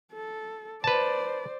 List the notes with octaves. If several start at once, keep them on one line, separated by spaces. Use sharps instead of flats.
A4
B4 C5 D5 A5